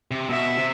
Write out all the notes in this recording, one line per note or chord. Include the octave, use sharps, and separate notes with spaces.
C3
B2 E5
C3